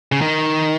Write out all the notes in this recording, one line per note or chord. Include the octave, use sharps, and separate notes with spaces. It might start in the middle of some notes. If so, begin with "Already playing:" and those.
C#3
D#3